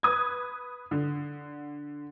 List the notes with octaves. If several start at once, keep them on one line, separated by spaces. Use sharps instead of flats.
B4 D#6 G#6
D3